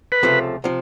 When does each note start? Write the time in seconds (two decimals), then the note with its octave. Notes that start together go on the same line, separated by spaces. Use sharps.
0.12 B4
0.23 C#2 C3 F3 A3
0.64 C3 F3